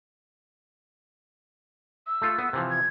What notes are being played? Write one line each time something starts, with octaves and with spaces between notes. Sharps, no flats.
E6
A3 F4 A4
B3
C3 E3 F3
G#6